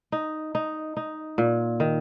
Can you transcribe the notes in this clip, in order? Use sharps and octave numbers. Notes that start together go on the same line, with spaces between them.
D#4
D#4
D#4
A#2
D#3